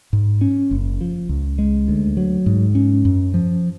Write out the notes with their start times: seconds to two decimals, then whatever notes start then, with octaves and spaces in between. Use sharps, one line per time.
0.13 G#2
0.41 C#4
0.71 F#1
1.01 F3
1.29 C#2
1.59 G#3
1.88 D2
2.17 F#3
2.46 G#2
2.75 C#4
3.05 F#2
3.34 F3